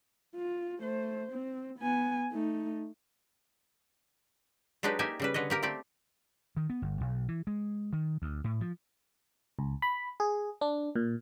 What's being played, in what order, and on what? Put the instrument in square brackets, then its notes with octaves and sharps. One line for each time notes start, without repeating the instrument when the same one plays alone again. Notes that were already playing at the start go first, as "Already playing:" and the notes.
[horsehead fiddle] F4
A3 C5
C4
B3 G#5
A3 D#4
[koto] F#3 G#3 D4 D#4 G4 B4
A#3 D#4 G4 E5 G#5
C#3 G3 B4
D3 B4 C#5 D#5
A#3 G4 A#4
A3 C4 G4 D5
[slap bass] D#3
B3
G1
B1
E3
G#3
D#3
D2
A2
F3
[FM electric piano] C#2
B5
G#4
D4
A#2